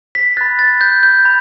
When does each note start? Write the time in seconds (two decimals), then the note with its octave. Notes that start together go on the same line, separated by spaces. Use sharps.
0.15 B6
0.37 B5 F#6 A6
0.59 A6
0.81 G6
1.03 G6
1.25 B5